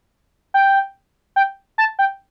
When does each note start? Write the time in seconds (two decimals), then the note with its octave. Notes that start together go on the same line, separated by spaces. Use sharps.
0.54 G5
1.36 G5
1.78 A5
1.99 G5